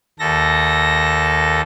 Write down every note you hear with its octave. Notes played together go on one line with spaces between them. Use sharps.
D#2 A4 A#6